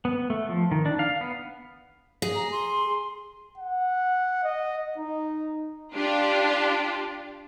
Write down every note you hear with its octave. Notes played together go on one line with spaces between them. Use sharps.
B3
A3
F3
D#3
D4
F5
B3
G#4
A#5
C6
F#5
D#5
D#4
D4 F4 G4